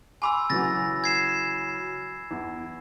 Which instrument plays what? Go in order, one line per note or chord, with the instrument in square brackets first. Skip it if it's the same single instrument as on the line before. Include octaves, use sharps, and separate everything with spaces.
[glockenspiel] G#5 B5 E6 [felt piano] C6 D6
[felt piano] C#3 E3 F#3 [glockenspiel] A6 A#6
[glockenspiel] G#6 C7 E7
[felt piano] E2